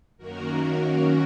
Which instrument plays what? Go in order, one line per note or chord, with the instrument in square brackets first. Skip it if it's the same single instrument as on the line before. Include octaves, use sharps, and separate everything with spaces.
[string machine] F#2 D#3 A#3 C#4 F#4 A#4